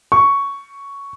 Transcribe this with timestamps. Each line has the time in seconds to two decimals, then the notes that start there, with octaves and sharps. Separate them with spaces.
0.12 C#6